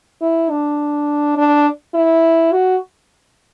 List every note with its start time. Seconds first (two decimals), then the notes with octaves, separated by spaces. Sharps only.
0.21 E4
0.50 D4
1.37 D4
1.94 E4
2.52 F#4